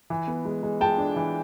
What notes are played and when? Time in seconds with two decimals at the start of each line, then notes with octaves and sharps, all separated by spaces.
0.10 E3
0.28 B3
0.45 G#3
0.63 G#3
0.81 G#3 G5 A5
0.98 D4
1.16 E3